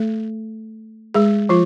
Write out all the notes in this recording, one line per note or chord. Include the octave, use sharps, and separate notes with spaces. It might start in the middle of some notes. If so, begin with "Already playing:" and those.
Already playing: A3 A4
G#3 G#4
F3 F4